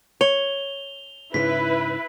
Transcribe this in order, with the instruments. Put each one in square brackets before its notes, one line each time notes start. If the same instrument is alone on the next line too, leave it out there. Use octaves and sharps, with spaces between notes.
[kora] C#5 [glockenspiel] F7 G7
[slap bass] G#2 C#3 [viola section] E4 B4 [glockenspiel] B6